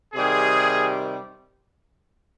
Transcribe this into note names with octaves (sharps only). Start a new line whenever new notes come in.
C3 D#3 G3 G#4